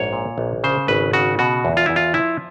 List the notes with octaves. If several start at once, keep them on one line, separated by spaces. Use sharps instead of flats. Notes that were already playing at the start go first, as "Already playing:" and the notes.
Already playing: A#1 G#2 C#5
A#2
A#1
C#3 C5
G#1 B4
C#3 F#4
B2 F#4
E2
F4
E2 E4
F4
F3 E4